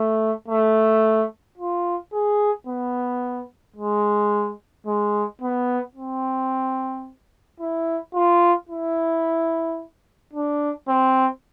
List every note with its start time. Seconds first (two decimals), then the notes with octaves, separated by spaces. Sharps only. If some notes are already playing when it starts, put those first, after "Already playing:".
Already playing: A3
0.48 A3
1.58 F4
2.13 G#4
2.67 B3
3.76 G#3
4.86 G#3
5.41 B3
5.95 C4
7.60 E4
8.14 F4
8.69 E4
10.33 D4
10.88 C4